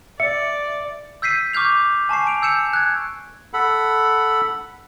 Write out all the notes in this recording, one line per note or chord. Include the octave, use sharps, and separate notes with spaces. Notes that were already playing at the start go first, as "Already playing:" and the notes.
D5 E5 C#7
E6 G6 B6 C7 D#7
C#6 D6 F6 G6 F7
G#5 A5 C#6 C7
D7 F7
E6 G6 C#7 E7
F#6 G#6
A4 F#5 B5